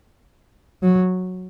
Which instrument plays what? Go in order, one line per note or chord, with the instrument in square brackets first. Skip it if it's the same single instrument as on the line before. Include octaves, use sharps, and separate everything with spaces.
[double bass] F#3